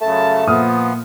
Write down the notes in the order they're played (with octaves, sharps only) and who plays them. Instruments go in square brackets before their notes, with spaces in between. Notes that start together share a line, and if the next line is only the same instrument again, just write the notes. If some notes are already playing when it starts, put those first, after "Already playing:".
[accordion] F#2 C#3 A5 [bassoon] A3
[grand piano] A#2 D#6 F6 [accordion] F3 B3